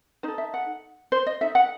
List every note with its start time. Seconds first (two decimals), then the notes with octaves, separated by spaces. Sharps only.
0.23 D#4 A4 C5
0.38 E5
0.54 F#5
1.12 C5
1.26 D#5
1.41 D#4 A4 E5
1.55 F#5